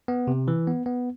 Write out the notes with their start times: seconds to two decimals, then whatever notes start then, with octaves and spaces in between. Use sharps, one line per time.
0.08 B3
0.27 C3
0.48 E3
0.67 B3
0.86 B3